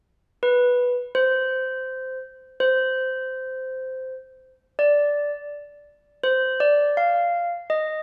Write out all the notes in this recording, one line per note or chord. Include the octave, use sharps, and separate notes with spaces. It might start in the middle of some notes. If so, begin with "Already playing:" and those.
B4
C5
C5
D5
C5
D5
F5
D#5